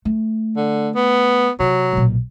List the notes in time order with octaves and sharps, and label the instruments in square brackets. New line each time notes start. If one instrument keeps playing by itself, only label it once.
[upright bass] A3
[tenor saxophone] D3
B3
[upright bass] C3 [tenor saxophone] F#3
[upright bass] B1 A#2